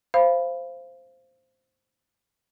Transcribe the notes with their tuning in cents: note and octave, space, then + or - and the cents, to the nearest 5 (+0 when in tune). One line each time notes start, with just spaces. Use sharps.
C5 +0 F5 -20 B5 +0